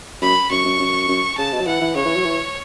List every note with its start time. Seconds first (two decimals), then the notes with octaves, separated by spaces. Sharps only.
0.21 F#2 B5
0.50 F#2 C#6
0.65 F#2
0.80 F#2
1.08 F#2
1.38 C#3 A5
1.53 B2
1.61 F#3
1.67 E3 F#5
1.81 E3
1.95 C#3 C#5
2.05 E3
2.15 F#3
2.25 E3